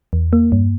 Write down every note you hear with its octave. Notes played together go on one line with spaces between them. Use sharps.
E2
A#3
G2